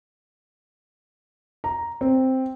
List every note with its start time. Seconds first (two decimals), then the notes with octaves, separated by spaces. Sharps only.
1.64 A#5
2.01 C4